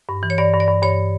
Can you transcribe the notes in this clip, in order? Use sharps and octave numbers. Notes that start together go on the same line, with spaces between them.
G2
E3
C#5
G2 D5
G2
D5
G2
G2 C#5